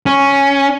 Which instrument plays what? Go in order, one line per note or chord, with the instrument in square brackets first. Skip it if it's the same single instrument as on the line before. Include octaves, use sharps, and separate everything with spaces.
[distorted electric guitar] C#4